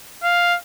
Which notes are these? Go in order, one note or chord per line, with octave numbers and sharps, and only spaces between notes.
F5